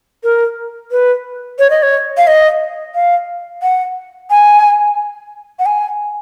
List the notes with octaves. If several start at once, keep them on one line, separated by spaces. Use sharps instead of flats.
A#4
B4
C#5
D#5
C#5
F5
D#5
F5
F#5
G#5
F#5
G#5